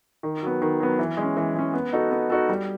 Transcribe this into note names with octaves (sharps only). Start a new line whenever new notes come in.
D#3
F#3 B3
D#3
F#3 B3
E3
G#3 C#4
E3
G#3 C#4
B3
D#4 F#4 A4
B3
D#4 F#4 A4
G3